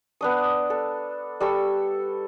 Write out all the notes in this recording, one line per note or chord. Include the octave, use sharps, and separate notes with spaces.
B3 D4 D#6
A4
G3 A4 C#6 E6